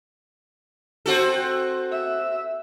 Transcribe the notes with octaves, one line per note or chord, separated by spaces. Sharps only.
C4 F#4 A4
E5